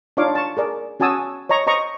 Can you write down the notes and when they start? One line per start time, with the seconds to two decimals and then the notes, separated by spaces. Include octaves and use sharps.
0.17 D4 D#4 F4 C#5 F5 D6
0.35 A5 C#6
0.57 G#4 A#4 D5
1.00 C#4 F#4 G#5 A5 D#6 E6
1.49 C#5 D#5 A#5 C#6
1.67 C5 D#5 A#5 C#6